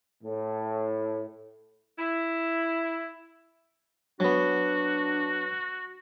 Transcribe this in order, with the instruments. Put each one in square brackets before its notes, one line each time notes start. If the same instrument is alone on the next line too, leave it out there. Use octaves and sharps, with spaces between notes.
[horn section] A2
[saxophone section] E4
[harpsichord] F#3 B3 [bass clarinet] D4 [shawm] F#4